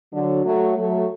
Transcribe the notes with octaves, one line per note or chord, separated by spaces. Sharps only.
D3 F#3
F#3 A3
F#3 A3